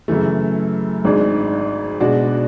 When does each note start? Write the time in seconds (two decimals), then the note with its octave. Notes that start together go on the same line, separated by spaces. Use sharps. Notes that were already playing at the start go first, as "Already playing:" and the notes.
0.08 F#2 C#3 E3 A3
1.04 G#1 G#2 G#3 D4
2.00 B2 G#3 D4 F#4